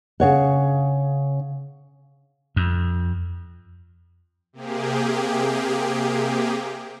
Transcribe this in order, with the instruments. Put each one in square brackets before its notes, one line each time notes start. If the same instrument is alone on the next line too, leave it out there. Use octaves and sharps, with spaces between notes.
[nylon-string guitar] C#3 C#5 F#5
[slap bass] F2
[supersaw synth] C3 A#3 G4 G#4